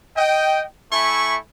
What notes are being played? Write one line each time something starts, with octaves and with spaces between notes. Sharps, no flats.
D#5 G5
A3 E4 G#5 B5 C#6